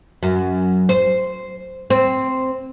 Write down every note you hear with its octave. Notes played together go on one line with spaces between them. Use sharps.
F#2
C5
C4